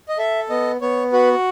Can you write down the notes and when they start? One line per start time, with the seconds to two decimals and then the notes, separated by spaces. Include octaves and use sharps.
0.08 D#5
0.18 A4 E5
0.50 B3 D#5
0.81 B3 C#5
1.13 F#4 B4